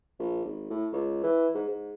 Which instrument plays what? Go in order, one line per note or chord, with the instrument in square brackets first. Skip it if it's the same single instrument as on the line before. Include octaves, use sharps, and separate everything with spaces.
[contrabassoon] A#1
G#1
A2
C#2
E3
G#2
G#2